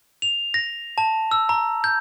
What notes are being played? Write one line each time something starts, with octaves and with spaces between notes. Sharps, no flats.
F7
A#6
A5
E6
A#5
G6